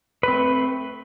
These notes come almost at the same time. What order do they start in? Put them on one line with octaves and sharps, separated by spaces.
B4 C4 A3